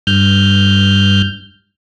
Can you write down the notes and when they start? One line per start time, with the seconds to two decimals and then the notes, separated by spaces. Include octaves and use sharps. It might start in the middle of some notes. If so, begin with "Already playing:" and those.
0.07 G2 F6 G6